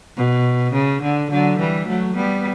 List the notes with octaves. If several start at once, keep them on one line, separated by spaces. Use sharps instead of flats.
B2
C#3
D3
D3 F#3
E3 G3
F#3 A3
G3 B3